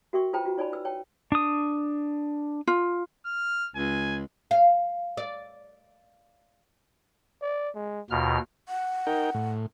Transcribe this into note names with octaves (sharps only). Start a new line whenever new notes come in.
F#4 A#4 E5 G5 C6 C#6
F4 B4 C5 G5 A5 A#5
F4 F#4
D#4 C#5 D5 G#5 A5 B5
B4 E6
C#5 G5 A5
D4 D#6
F4
F6
C#2 G#5
F5
D5
D5
G#3
D#2 B2 F4 F6
F#5
D#4 A#4 G5
A2